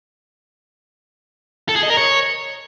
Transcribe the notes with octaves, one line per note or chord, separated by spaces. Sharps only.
A4
G#4
D#5
A#4
C#5